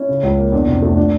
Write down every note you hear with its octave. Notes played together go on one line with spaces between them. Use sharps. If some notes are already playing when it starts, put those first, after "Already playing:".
Already playing: C#4 E4
C#3
C#2
A#3
E2 D4
F1
A3
D4